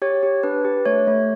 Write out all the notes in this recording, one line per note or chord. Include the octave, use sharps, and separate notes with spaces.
G4 C#5
G4
D4 B4
G4
A3 C#5
A3